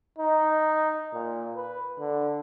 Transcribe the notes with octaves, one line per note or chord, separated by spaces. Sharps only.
D#4
A#2
B4
D3